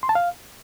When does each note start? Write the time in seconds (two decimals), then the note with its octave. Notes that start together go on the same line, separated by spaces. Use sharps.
0.03 C6
0.09 A5
0.15 F5